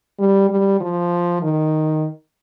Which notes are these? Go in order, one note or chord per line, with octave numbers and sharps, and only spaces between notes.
G3
G3
F3
D#3